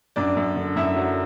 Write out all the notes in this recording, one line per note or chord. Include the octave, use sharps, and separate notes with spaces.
F#2 D4 D5
F#2
D3
F#2 E4 E5
F#3